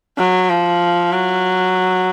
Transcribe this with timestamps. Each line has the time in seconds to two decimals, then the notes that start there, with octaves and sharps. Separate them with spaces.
0.18 F#3
0.50 F3
1.12 F#3